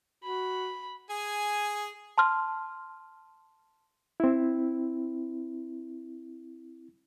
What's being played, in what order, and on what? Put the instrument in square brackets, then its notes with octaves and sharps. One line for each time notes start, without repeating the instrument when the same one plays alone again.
[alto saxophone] F#4 [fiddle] B5
[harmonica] G#4 G#5
[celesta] A5 C6 F6
[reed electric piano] C4 E4